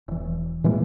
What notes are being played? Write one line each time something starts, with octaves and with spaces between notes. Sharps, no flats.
E1 E3
A#2 E3 G#3 A#3